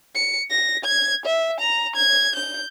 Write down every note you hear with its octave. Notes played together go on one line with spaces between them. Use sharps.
C#7
A#6
G#6
E5
A#5
G#6
G6